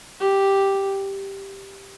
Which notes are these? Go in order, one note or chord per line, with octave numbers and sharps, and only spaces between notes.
G4